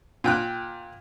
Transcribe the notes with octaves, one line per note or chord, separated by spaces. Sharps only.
A#2 G5 F#6